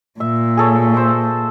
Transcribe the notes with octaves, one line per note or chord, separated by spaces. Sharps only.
A#2 E5
G#4 A4 C#5
C5 E5